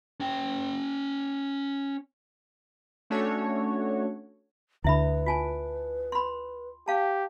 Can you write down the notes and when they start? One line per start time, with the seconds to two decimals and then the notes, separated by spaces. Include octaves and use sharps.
0.20 C#4 G5
3.10 A3 C#4 D4 F#4 A4 C#5
4.84 D2 D3 E4 B4 E5 B5
5.26 F4 G#5 A5
6.12 B5 C6
6.88 G4 F5 A5